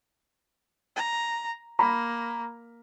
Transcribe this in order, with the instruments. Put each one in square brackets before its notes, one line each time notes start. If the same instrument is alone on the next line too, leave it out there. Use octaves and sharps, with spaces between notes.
[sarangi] A#5
[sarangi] A#3 [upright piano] A#5 B5